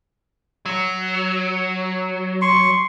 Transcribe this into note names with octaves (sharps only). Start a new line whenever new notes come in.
F#3
C6 C#6